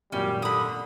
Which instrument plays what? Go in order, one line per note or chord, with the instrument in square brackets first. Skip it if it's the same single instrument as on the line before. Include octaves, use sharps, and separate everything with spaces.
[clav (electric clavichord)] G#1 F#2 A#2 [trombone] G3 [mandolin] C#4
[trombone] D3 [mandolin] B5 D#6